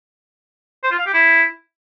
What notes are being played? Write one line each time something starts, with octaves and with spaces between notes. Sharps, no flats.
C5
F4
F5
G4
E4